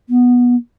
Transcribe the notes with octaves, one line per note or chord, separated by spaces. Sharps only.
B3